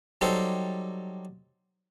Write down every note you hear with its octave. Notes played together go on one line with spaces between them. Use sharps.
F#3 G3 D#4 G4 A4 C5